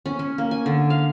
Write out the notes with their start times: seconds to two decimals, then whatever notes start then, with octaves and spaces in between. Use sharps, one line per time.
0.06 C#4
0.19 C#4
0.38 A#3
0.51 G#5
0.66 D3
0.90 F5